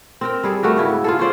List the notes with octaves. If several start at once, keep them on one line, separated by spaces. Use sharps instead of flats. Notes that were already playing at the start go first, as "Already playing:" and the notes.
C4 A#4 G5
G3 G#4 A4
A3 F#4 G4 A#4
G#2 C#3 E4 B4
F4 G#4 A4
C#4 F4 C5 D5